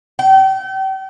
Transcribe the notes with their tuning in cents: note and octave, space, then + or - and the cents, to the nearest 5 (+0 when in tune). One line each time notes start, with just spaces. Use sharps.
G5 -35